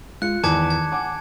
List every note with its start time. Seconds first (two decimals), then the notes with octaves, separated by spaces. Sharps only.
0.22 G#3 F4 F#6 C#7
0.44 E2 D#3 A5 D6 G#6
0.70 G#6
0.92 F#5 G#5 D6